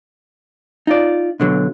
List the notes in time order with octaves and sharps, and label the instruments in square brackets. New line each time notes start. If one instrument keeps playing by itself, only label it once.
[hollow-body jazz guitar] D#4 F4 D5
B2 D3 F#3